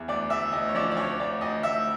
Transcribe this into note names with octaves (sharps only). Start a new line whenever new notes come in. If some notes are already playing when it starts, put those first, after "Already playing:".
Already playing: E2
D2 D5
D2 E5
D2 D#5
C#5
F3 D5
D5
D2 C#5
D2 D5
D2 D#5
D2 E5